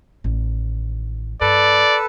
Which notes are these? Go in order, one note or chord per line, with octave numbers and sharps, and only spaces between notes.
A1 D#3
G2 A4 B4 D5